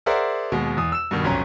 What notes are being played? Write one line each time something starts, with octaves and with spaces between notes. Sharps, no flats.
G#4 A#4 C5 D5 E5 F#5
D#2 B2 G#3
E2 D#6
E6 E7
G2 B2 D#3
F1 B1 C#4 A#5